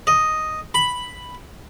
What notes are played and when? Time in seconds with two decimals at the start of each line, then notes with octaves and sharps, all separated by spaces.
0.07 D#5
0.74 B5